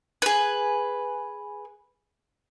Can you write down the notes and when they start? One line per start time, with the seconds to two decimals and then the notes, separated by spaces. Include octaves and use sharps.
0.22 G#4 B4